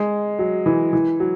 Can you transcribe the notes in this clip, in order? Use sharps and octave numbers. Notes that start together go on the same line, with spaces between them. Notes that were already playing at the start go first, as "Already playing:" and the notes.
Already playing: G#3
F#3
E3
E3
F#3